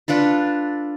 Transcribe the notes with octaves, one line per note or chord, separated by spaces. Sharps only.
D4 F4 A4 B4